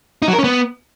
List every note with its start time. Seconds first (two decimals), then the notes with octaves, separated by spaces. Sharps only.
0.22 D#4
0.28 F#3
0.33 A#4
0.39 C#4
0.44 B3